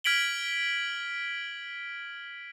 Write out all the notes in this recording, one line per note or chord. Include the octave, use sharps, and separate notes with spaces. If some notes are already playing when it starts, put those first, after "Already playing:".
F6 G#6 B6 D7 F#7 G7